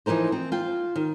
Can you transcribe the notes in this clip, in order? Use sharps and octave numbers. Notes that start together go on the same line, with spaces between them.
E3 F3 D#4 A#4 C5
C4
F4 G5
D#3